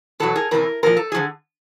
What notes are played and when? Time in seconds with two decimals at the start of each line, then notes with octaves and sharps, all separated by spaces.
0.20 E2 B2 F#3 A4
0.36 G#4 A#4
0.51 E2 C3 E3 A#4
0.83 A#2 F3 A#4
0.97 A4
1.12 D3 F3 G#4